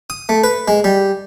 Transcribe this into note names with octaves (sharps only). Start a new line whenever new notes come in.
D#6
A3
B4
G#3
G3